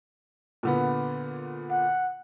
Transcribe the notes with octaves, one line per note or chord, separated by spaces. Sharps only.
A#2 D3 B3
F#5